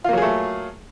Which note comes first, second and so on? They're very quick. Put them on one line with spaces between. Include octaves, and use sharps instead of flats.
F4 A#3 F#3 G#4 A3